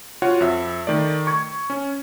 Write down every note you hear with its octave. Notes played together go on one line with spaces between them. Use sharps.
F4 F#4 C#5 F#5
F2 E5
D#3 A3 D5
C#6 G#6
C#4